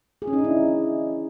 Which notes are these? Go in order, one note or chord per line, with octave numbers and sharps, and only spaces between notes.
G#4
C#4
D#4
D4
E4